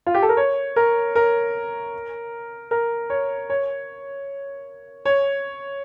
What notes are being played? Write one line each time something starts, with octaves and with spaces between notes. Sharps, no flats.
F4
G4
A4
A#4
C#5
A#4
A#4
A#4
C#5
C#5
C#5